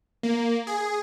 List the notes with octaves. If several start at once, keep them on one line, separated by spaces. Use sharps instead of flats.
A#3
G#4